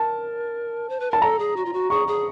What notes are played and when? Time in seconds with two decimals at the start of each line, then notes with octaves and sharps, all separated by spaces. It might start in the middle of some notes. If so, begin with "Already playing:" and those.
Already playing: A#4 A5
0.89 C5
1.00 B4
1.11 A#4 A5
1.22 A4 A#5
1.39 G#4
1.56 F#4
1.65 F4
1.73 F#4
1.90 G#4 C#6
2.08 G#4